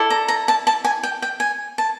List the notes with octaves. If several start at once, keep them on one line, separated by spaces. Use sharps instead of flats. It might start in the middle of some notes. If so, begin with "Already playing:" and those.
Already playing: E4 A4 D5
A#5
A#5
A5
A5
G#5
G5
G5
G#5
A5